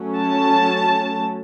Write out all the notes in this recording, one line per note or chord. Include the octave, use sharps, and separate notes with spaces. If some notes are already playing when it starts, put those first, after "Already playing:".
Already playing: F#3 A3 C#4
A5